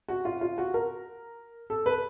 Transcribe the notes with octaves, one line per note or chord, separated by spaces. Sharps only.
F#4
F4
F4
F#4
A#4
A4
B4